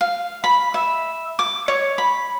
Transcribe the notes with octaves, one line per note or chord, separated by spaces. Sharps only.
F5
B5
E5
D6
C#5
B5